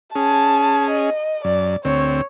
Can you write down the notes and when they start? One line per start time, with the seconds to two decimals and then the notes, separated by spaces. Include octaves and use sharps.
0.15 C#4 G#4 A5
0.90 D#5
1.44 F#2 D5
1.85 D2 C4 C#5